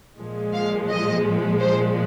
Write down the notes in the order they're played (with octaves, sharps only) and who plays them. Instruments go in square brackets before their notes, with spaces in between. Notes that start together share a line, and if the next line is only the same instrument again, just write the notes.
[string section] A#2 F3 G#3
F5
D#5
C5